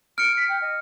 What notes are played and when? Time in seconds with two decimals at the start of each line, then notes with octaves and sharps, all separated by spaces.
0.18 F6 C#7 D7
0.37 B6
0.49 G5
0.62 D#5